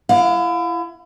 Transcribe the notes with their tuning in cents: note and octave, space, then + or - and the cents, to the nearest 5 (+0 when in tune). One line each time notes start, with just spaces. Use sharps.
E4 +35 F5 +40